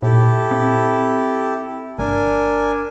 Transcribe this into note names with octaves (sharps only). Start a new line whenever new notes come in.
A#2 E4 G4 A4
C4
G1 D4 A#4 G#5